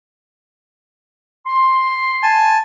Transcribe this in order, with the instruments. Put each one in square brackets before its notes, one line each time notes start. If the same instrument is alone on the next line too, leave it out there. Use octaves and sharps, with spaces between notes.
[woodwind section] C6
[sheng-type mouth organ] G#5 A5